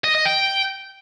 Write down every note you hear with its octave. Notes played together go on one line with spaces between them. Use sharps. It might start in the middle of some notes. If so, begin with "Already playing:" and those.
D#5
D#5
G5